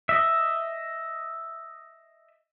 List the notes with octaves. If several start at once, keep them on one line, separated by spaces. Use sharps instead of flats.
D#5 E5